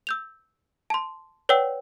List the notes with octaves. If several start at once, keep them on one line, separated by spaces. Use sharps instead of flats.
E6 G6 F7
A5 C6
B4 C#5 D5 F#5 G5 E6